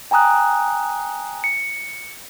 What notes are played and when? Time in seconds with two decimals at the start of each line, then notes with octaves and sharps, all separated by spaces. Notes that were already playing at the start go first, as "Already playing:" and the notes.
0.11 G5 G#5 A#5 D#6 F#6
1.44 C#7